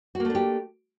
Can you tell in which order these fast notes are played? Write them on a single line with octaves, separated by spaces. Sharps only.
F#4 A#3 A3 D4 G4